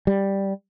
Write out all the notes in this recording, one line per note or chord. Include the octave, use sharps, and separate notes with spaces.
G3